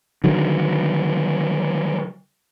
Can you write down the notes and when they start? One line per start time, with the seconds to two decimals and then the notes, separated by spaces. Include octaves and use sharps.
0.24 D3 D#3 F#3